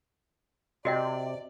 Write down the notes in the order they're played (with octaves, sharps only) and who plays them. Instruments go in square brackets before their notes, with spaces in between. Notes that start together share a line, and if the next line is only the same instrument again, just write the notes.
[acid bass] C3 [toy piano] F#4 D#5 G5 [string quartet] D5